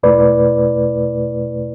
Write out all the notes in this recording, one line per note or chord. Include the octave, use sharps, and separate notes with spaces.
E2 B2 A3 E4 B4 D5